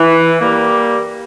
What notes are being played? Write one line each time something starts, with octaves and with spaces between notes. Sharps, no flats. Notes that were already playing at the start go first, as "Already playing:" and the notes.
Already playing: E3
G3 A#3